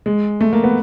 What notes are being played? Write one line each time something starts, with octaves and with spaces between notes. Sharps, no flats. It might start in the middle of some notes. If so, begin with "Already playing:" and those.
G#3
A3
A#3
B3